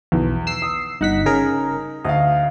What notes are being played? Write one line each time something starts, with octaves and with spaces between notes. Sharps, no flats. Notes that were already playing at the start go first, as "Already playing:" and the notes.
B1 E2
E6 C7
D#6
G1 D#4 F#5 B6
C#3 G#4 A#4
D2 D#5 F5